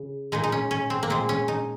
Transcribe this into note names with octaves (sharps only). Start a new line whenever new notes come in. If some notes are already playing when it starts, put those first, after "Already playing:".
Already playing: C#3
A#2 G#3 D#4
D#4
C#4
C#4
C4
A#3
A#2 G#3 C4
C#4
D#4